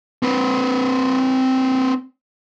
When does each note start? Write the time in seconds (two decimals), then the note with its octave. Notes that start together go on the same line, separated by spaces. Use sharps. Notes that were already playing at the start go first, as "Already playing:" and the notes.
0.23 C4 B4